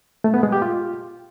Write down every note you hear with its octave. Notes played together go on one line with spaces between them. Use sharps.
A3
B3
G#3
G4
F4